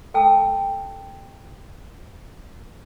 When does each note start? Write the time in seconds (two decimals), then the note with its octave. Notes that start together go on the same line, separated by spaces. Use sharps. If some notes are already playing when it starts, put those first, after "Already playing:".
0.14 A4 G5 A5 E6